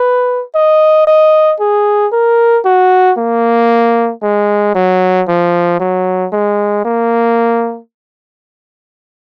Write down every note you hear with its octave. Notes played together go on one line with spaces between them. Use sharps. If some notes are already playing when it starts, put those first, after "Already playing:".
Already playing: B4
D#5
D#5
G#4
A#4
F#4
A#3
G#3
F#3
F3
F#3
G#3
A#3